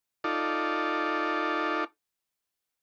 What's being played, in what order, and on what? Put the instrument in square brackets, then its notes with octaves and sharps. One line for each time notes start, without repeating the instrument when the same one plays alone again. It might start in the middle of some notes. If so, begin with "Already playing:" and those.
[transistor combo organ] D#4 F4 A4 D5